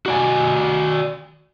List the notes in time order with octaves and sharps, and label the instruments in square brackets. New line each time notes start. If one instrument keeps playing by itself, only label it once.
[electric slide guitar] F#4 D5 G#5